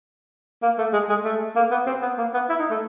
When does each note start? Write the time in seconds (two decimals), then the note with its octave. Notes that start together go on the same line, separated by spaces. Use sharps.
0.63 A#3
0.78 A3
0.93 G#3
1.09 G#3
1.24 A3
1.56 A#3
1.71 B3
1.86 C4
2.02 B3
2.18 A#3
2.34 B3
2.49 E4
2.59 D#4
2.71 A3